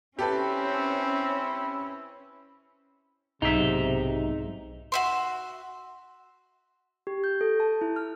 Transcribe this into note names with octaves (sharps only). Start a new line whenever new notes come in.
C4 C#4 E4 G4 A4 B4
B1 G#2 C3 D#4 E5
F#4 E5 C6
G4
G6
A4
A5
E4
F6